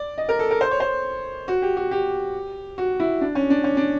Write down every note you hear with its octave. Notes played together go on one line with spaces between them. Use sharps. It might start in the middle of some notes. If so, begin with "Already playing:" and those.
Already playing: D5
D#5
A#4
A4
A#4
C5
C#5
C5
F#4
G4
F#4
G4
F#4
E4
D4
C#4
D4
C#4
D4